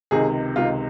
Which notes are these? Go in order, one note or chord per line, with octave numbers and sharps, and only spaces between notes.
C#2 C3 D#3 G#4
C#2 C3 D#3 F4